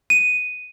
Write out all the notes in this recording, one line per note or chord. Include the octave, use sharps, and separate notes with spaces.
D#7